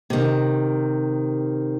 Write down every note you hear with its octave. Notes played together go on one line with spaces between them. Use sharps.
C3 D#3